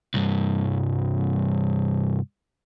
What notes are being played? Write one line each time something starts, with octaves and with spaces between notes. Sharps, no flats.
C2 G2